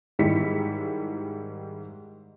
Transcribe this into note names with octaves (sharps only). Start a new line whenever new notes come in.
G#2 D#3 G3 E4 B6 C#7